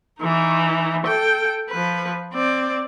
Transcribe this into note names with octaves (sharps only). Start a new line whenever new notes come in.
E3 D#4
A4 G5
F3 B4
C4 D5